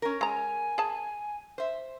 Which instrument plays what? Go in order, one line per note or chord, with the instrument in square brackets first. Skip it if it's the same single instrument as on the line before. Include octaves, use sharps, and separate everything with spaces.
[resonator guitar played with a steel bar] C#4 A#4
[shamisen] G#3 A#5 [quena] G#5
[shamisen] G#4 A5
[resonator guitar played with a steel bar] C5 E5